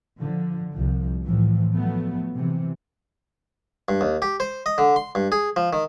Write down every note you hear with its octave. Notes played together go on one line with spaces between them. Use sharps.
D3 F3
C2 F3
A2 E3 F3
F3 F#3 A3 B3
C3 E3
G2
D#2
G4
C5
D#5
D3
C6
G2
G#4
F3
D#3